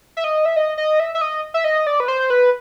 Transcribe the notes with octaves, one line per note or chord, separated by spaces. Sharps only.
E5
D#5
E5
D#5
D#5
E5
E5
D#5
E5
D#5
D5
B4
C5
B4